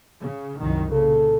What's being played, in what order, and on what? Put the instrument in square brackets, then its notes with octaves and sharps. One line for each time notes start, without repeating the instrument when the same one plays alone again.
[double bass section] C#3
C2 F#2 D#3
[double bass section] A#2 C#3 [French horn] A4